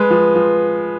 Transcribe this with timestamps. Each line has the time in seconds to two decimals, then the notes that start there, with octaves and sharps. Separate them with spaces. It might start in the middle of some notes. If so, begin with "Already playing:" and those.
Already playing: G#3 B4
0.11 F3
0.35 F3